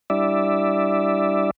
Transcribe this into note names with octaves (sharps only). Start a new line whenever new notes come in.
G3 D4 E4 D5 E5